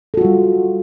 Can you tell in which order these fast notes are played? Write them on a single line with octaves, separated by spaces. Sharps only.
A4 F#4 F4 G3